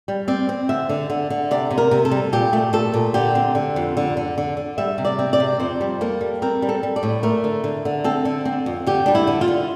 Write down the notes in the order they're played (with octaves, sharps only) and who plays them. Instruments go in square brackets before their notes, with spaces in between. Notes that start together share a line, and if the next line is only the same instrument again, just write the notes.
[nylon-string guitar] G3
C4 D5
C4
D3 E5
D3
D3
D3
C3 D5
C3
A#4
C3
A4
G3
A#2 G4
A3
A#2 A4
A#2
D3 G4
C4
D3
F2
D3
D3
D3
D3
G3 E5
C3
D5
C4
D5
C3
F2 C5
G3
A#3 A4
G3
C4 A#4
G3
A4
G3
D5
A2
A3 A#4
D3
D3
D3
C4 A4
D3
C4
F2
D3 G4
G3 D4
E4
D3
F4
D3